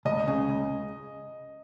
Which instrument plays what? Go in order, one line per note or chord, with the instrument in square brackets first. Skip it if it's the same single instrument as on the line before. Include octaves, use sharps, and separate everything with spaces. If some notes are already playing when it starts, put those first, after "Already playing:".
[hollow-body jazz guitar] C#2 [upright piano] D#5
[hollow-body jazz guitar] C#3
C#2